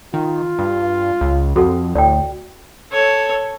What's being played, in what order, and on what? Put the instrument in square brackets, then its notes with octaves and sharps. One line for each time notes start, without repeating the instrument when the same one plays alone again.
[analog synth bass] D#3 [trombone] F4
[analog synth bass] G2
C#2
[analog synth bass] F2 [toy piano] F#4 A4 F#5
[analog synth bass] D2 [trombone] A2 [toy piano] D5 G5
[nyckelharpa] A4 C#5